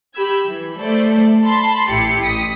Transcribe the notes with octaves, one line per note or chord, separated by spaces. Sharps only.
G4 B5 E6 G#6
E3
A3 A4 C5 D5
A5 B5 C6
A1 E4 G4 C7 C#7
A1 D#6 B6